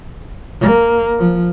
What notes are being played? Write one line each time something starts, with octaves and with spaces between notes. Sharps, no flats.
A#3
F3